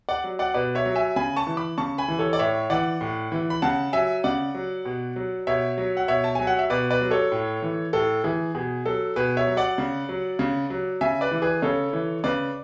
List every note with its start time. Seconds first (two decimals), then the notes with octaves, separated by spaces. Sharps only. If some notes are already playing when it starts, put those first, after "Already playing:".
0.09 D5 F#5
0.24 F#3
0.39 D5 F#5
0.54 B2 B4 D5
0.75 C#5 E5
0.85 F#3
0.96 E5 G#5
1.16 C#3 G#5 B5
1.36 A5 C#6
1.47 E3
1.57 B5 D6
1.78 C#3 A5 C#6
1.98 G#5 B5
2.08 E3
2.19 A4 C#5
2.33 D5
2.39 A2 C#5 E5
2.70 E3 D5 F#5
3.01 A2
3.32 E3
3.50 B5
3.62 C#3 F#5 A5
3.93 F#3 E5 G#5
4.24 C#3 D5 F#5
4.55 F#3
4.85 B2
5.16 F#3
5.47 B2 C#5 E5
5.78 F#3
5.97 F#5
6.08 B2 C#5 E5
6.24 A5
6.35 F#3 G#5
6.47 F#5
6.59 E5
6.70 B2 B4 D5
6.90 B4 D5
7.01 F#3
7.11 A4 C#5
7.32 A2
7.62 E3
7.93 A2 A4
8.24 E3 G#4
8.55 B2 G#4
8.85 F#3 A4
9.16 B2 G#4 B4
9.37 C#5 E5
9.47 F#3
9.57 D5 F#5
9.78 C#3
10.09 F#3
10.39 C#3
10.70 F#3
11.01 C#3 E5 G#5
11.21 B4 D5
11.31 E3
11.42 G#4 B4
11.62 C#3 A4 C#5
11.93 E3
12.24 C#3 B4 D5